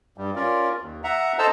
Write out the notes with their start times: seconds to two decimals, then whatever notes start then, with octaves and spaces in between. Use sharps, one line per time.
0.18 G2 G3
0.36 C#4 F4 A#4 D5
0.82 D#2
1.04 E5 F#5 A#5
1.39 A4 C5 D#5 A5 A#5 E6